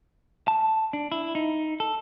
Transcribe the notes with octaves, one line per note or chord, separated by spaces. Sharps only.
A5
D4
E4
D#4
A4